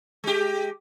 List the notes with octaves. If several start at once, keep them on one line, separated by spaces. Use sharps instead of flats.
G#3 G4